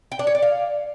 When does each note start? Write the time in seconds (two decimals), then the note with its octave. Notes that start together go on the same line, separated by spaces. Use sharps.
0.12 G5
0.19 D4
0.27 C#5
0.35 D5
0.42 F5